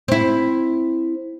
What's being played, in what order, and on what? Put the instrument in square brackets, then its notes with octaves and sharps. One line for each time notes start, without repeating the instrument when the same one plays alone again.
[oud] C4 E4